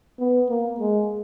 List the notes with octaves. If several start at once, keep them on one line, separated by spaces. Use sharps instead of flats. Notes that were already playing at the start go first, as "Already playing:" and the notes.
B3
A#3
G#3